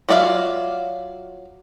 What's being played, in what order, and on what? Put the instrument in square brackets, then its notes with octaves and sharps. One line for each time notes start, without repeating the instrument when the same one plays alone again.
[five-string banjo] F#3 F4 D5 E5 F5